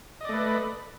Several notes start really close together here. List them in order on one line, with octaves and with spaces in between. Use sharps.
D#5 D5 A3 B4